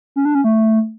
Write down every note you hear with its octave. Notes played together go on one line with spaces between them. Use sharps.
C#4
D4
C#4
A3